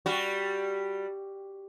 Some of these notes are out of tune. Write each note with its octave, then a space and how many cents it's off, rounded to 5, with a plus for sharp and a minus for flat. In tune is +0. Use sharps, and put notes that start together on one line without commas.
G3 +0 F#4 +0